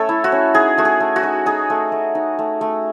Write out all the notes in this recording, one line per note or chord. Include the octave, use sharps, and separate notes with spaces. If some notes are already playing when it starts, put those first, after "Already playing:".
Already playing: A3 C#4 A4 C#5
E4
F#4
C#4
D#4 G#4
A3 F#4
G#4
A3
F#4
D#4
D#4 G#4
A3
A3
D#4
A3
A3